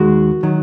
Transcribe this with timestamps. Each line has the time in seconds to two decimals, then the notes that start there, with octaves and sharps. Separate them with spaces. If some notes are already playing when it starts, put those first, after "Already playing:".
Already playing: D#2 D#3 G#3 F#4
0.43 D#3 F#3